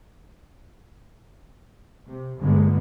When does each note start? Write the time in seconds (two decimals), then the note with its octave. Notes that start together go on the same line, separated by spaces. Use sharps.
2.06 C3
2.40 G1 G2 D3 G#3 A#3 B3